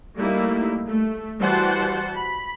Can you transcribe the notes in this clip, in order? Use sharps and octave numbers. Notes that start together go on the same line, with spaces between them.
G3 A3 A#3 D#4 E4
A3
E3 G3 F#4 C5 F#5 A5
B5